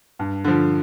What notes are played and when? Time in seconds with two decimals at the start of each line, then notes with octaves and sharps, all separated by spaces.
0.19 G2
0.44 D3 F3